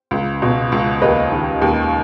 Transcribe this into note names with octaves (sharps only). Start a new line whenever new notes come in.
C#2
B2
C#2
D#2 B4 D#5
D#3
D#2